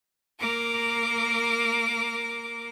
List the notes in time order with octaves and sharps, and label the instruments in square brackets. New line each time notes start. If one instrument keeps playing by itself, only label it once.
[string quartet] A#3 A#4 D6